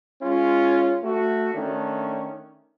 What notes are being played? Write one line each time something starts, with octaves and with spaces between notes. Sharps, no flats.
G#3 C#4 F4
A3 F#4
D#3 A3 C#4 D4